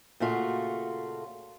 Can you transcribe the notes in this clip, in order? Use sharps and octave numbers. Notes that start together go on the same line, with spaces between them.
A#2 C#3 A3 F4 F#4